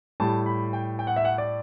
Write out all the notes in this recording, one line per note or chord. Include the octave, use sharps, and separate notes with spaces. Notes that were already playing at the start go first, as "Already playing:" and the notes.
A2 G3 A5
B5
G5
G5
F#5
E5
F#5
D5